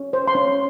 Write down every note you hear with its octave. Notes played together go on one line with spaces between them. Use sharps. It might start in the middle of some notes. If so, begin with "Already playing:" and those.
Already playing: C#4
C5
C6
C#4